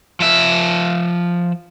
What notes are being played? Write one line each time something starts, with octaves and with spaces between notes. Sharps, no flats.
F3 E5